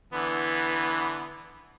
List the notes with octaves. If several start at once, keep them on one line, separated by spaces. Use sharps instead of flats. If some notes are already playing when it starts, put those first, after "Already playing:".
D3 E3 B3